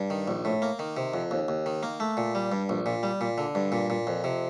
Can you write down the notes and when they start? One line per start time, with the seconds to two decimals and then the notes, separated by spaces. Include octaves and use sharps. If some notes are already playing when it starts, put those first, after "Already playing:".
Already playing: G2
0.10 D#3
0.28 A#1
0.45 A2
0.62 A#3
0.79 D#3
0.97 C3
1.14 F2
1.31 D#2
1.48 D#2
1.66 D#3
1.83 A#3
2.00 A3
2.17 A#2
2.35 G3
2.52 G2
2.69 A#1
2.86 A#2
3.03 G3
3.21 A#2
3.38 D3
3.55 G2
3.72 A#2
3.90 A#2
4.07 F2
4.24 C3